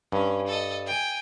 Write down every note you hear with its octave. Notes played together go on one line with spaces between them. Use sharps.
G2 C#4
A4 D#5
G5 G#5